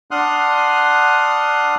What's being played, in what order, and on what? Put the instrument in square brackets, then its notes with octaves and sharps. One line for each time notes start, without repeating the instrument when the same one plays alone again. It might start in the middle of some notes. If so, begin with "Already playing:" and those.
[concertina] D4 F#5 C6 D#6 F6 F#6